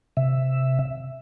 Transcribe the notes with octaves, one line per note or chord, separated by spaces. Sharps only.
C3 E5